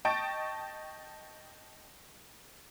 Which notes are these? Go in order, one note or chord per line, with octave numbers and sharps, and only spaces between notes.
D#5 G5 A5 C#6 A6 D7